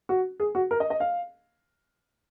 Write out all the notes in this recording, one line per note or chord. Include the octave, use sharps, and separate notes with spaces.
F#4
G#4
F#4
A#4
D#5
D#5
F5